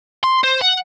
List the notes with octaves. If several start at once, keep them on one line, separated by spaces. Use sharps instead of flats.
C6
C5
F#5